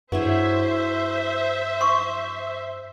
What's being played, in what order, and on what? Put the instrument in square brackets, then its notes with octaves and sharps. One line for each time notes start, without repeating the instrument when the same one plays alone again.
[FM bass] G2 [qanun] F#3 E4 G#4 [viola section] C5 E5
[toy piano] C6 C#6